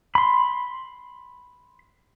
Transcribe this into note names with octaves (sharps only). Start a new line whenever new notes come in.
B5 C6